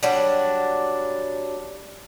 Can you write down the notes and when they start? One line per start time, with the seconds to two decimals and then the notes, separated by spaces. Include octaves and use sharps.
0.03 F#3 G3 D4